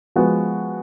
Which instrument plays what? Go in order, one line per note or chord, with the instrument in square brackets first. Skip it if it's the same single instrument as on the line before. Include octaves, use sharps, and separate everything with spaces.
[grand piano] F3 G#3 B3 F#4